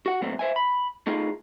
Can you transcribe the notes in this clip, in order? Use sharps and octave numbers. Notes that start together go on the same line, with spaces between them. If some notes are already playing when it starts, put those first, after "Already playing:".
F#4 F#5
A#2 F#3 A3 C4
C5 E5 G#5
B5
A3 D#4 F4 G#4